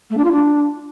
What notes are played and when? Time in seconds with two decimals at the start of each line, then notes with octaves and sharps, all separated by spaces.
0.10 A3
0.17 D4
0.24 F4
0.31 D4